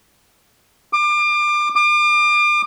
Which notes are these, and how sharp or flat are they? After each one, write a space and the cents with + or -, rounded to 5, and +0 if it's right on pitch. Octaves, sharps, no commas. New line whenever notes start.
D6 +30
D6 +35